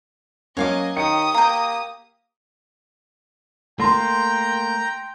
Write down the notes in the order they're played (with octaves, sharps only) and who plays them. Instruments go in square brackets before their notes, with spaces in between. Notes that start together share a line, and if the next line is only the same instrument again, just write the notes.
[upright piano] F#3 A#3 C#4 [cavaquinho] C#5 F5 D6 [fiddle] D#5 G#5
[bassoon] D#3 [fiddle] G4 D#6 [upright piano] C#7
[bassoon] A#3 [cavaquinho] G5 A#5
[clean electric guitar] A3 A#3 [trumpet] G5 [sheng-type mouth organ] A#5 [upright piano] C6